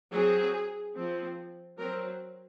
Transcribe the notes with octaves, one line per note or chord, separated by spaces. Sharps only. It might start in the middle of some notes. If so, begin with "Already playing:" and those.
F#3 C4 G#4
F3 C4
F#3 C4 A#4